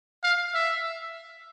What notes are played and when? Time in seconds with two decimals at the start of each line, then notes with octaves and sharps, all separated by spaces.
0.24 F5
0.54 E5